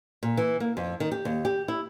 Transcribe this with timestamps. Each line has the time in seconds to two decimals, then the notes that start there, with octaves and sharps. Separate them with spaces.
0.23 A#2
0.37 E3
0.60 A#3
0.77 F2
1.00 D#3
1.12 G4
1.25 D#2
1.45 G4
1.68 E4